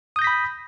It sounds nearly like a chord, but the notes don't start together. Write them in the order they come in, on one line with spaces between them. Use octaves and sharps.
D#6 G6 A#6 B6 B5